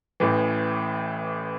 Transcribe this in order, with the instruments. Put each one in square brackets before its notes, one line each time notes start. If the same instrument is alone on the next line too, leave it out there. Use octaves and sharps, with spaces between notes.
[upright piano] A1 A2 E3